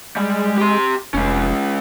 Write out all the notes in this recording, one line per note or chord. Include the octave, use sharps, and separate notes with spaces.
G3 G#3
G4 C6
F1 G#3 C#4